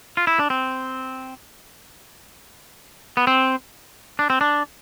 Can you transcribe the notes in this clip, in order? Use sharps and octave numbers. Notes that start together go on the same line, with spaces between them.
F4
E4
D4
C4
B3
C4
D4
C4
D4